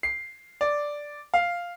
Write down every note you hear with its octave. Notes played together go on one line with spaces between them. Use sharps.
C7
D5
F5